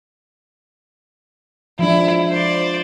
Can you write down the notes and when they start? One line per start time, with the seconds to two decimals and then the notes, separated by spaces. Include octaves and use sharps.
1.79 F3 G#3 D4 E4
2.30 C5 D5